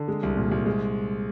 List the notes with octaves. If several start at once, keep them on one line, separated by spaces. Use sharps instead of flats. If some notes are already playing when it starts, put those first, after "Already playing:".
Already playing: D3
G#3
C2
A#2
C2
G#3